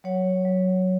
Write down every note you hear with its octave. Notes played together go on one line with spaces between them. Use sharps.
F#3 C#5 F#5
F#3